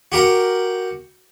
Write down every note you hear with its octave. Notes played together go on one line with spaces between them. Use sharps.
F#4 G4 A#4 F#5